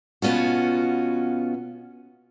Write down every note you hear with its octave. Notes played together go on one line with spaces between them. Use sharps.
B2 B3 C#4 F4 F#4